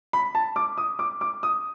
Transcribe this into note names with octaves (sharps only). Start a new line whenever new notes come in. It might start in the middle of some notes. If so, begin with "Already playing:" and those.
B5
A5
D6
D#6
D6
D6
D#6